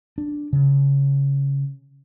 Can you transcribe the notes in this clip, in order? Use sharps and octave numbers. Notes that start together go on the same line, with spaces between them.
D4
C#3